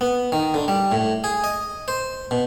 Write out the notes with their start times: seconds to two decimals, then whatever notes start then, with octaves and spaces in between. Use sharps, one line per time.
0.01 B3
0.32 D#3
0.54 D3
0.68 G3
0.92 A2
1.24 G#4
1.44 D#5
1.88 C5
2.31 B2